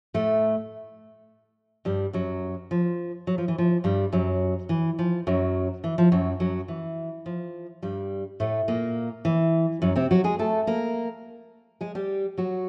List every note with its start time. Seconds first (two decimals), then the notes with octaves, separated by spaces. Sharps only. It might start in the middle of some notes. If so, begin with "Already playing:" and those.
0.14 A2 A3
1.85 G2 G3
2.13 F#2 F#3
2.71 F3
3.27 F#3
3.38 F3
3.48 E3
3.58 F3
3.84 G2 G3
4.13 F#2 F#3
4.69 E3
4.99 F3
5.27 F#2 F#3
5.84 E3
5.98 F3
6.12 F#2 F#3
6.40 F#2 F#3
6.68 E3
7.26 F3
7.83 G2 G3
8.40 A2 A3
8.68 A#2 A#3
9.25 E3
9.82 F#2 F#3
9.96 C3 C4
10.11 F#3 F#4
10.24 G#3 G#4
10.39 A3 A4
10.67 A#3 A#4
11.81 G#3 G#4
11.95 G3 G4
12.38 F#3 F#4